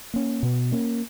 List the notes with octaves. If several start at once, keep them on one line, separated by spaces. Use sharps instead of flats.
A#3 C#4
B2
A#3 C#4